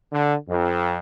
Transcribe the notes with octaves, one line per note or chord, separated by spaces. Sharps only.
D3
F2